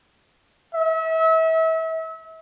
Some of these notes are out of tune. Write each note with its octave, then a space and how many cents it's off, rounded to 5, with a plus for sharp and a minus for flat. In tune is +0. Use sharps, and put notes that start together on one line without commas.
E5 -35